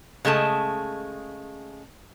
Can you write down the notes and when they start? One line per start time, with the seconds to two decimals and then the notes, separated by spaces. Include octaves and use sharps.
0.25 C#3 G#3 A3 A5